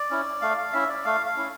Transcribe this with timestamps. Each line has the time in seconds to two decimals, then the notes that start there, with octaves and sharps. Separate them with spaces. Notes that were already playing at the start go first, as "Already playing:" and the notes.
Already playing: D5
0.10 C#4 E4
0.42 A3 F5
0.58 F5
0.73 C#4 E4 E5
0.89 D5
1.05 A3 F5
1.26 F5
1.36 C#4 E4